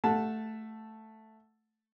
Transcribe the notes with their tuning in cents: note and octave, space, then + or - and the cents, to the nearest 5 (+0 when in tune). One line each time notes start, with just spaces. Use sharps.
A3 +0 F#5 -20 A5 +0